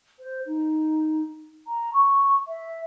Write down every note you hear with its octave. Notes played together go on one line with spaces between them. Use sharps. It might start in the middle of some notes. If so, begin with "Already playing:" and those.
C5
D#4
A#5
C#6
E5